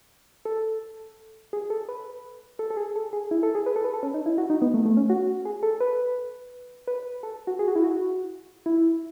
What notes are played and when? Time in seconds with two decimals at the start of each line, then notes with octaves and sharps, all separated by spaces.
0.45 A4
1.53 G#4
1.70 A4
1.89 B4
2.59 A4
2.70 A4
2.77 G#4
2.96 A4
3.13 G#4
3.31 E4
3.43 A4
3.55 G#4
3.66 B4
3.76 A4
3.84 B4
3.93 A4
4.03 C#4
4.14 D#4
4.26 E4
4.38 F#4
4.50 D#4
4.62 B3
4.74 A3
4.85 A3
4.97 C#4
5.10 F#4
5.45 G#4
5.63 A4
5.80 B4
6.88 B4
7.23 A4
7.47 F#4
7.59 G#4
7.68 F#4
7.76 E4
7.84 F#4
8.66 E4